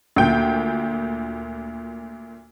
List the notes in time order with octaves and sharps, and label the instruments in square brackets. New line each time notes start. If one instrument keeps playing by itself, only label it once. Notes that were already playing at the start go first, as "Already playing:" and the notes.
[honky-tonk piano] D2 A#2 G5